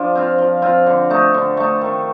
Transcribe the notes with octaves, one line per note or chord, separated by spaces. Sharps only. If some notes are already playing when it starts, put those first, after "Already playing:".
Already playing: F3 D4
C4 F4
F3
C4 F4
D3
A3 D#4
D3
A3 D#4
D#3